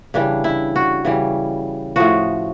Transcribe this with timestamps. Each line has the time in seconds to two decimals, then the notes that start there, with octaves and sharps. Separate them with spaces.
0.14 C#3 E3 G3 D4
0.44 E4
0.76 F#4
1.05 C#3 E3 G3
1.96 A2 F3 F#4